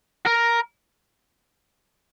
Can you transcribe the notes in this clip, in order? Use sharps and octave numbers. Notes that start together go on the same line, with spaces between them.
A#4